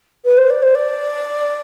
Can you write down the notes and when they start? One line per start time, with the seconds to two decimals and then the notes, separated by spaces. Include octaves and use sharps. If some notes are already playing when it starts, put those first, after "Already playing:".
0.25 B4
0.37 C5
0.50 D5
0.62 C5
0.75 D5